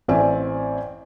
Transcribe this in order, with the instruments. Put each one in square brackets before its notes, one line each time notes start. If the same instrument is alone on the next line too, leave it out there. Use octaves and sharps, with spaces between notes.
[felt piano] A1 C4 D5 E5 G#5